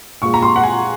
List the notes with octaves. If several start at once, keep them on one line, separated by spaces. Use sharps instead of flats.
A#2 G#3 C#6
A#5
C6
F#5
G#5